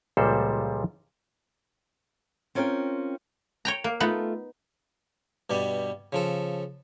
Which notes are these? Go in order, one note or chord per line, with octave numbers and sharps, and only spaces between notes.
C#2 A#2 F3 G3 A4 C5
C4 C#4 F4 A#4 D5 G5
C#5 G5 A#5
A#3
A3 B3 D#4 F4 F#5
G2 B2 G3 D5
C#3 F3 A4